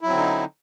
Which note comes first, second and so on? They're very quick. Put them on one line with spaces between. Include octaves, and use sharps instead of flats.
E4 F#3 C4 D3 D#4